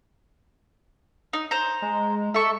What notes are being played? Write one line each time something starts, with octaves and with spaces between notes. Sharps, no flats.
D#4
C5 A#5
G#3
A4 E5 C#6